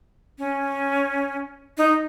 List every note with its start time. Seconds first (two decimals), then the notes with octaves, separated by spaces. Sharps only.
0.38 C#4
1.78 D#4